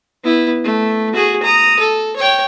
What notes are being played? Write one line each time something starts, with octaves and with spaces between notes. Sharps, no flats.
B3 E4
A3
F#4 G#4
A#5 D#6
A4
C#5 G5